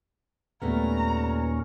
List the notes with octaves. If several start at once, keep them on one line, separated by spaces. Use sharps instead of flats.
D#2 A#2 G3 A3 B3 C#4 A#5